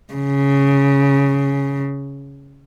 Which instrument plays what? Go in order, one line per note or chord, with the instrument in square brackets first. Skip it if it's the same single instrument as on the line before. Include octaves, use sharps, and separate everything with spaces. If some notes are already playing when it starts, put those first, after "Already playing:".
[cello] C#3